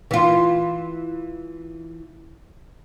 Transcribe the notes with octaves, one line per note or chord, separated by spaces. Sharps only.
E3 F4